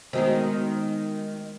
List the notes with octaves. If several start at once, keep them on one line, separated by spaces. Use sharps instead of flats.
D#3 G#3 B3 D#4 F#4 C5